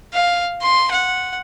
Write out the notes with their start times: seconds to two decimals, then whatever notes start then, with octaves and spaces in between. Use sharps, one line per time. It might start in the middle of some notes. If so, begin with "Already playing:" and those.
0.13 F5
0.62 C6
0.92 F#5